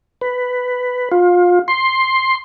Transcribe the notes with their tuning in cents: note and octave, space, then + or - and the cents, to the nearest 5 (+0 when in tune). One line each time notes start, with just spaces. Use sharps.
B4 +10
F4 +25
C6 +10